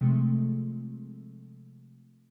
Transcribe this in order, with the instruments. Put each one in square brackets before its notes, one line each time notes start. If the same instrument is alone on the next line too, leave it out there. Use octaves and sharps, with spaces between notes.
[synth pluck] C3 F3 G#3 A3